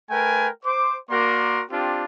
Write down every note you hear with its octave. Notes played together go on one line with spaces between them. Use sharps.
A3 A#4 B4 G5 G#5
C5 D6
A#3 F#4 A#4 D5 C6
C4 D4 F4 G4